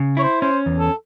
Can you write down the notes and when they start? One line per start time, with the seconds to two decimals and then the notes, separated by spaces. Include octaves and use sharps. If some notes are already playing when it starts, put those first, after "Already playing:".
Already playing: C#3
0.17 E4 C#5
0.23 C5
0.41 C#4 C5
0.66 E2
0.79 A4